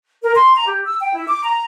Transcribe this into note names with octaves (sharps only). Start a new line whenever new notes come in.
A#4
C6
A#5
G4
E6
G5
E4
D6
A#5